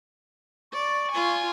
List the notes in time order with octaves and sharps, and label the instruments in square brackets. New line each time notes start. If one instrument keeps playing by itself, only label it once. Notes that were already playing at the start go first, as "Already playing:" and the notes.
[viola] D5 [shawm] C#6
[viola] F4 G#5